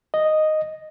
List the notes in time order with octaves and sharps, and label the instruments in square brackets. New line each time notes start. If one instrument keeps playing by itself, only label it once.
[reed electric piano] D#5